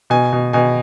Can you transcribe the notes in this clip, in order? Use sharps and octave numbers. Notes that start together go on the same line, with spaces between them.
B2 G#5
B2
B2 G#5